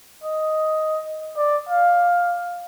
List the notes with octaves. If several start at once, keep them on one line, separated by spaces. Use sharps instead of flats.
D#5
D5
F5